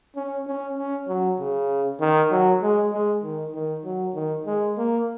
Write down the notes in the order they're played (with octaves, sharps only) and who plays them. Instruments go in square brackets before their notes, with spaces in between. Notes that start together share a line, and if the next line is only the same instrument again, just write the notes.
[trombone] C#4
C#4
C#4
F#3
C#3
D#3
F#3
G#3
G#3
D#3
D#3
F#3
D#3
G#3
A#3